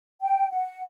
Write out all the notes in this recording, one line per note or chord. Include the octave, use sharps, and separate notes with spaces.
G5
F#5